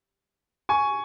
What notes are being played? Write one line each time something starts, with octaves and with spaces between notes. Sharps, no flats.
G#5 C#6